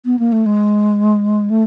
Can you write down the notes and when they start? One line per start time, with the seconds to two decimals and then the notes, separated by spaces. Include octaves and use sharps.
0.05 B3
0.19 A#3
0.32 A3
0.46 G#3
1.50 A3